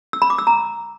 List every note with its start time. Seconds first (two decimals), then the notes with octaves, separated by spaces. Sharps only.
0.13 E6
0.22 B5
0.30 D6
0.38 E6
0.47 A#5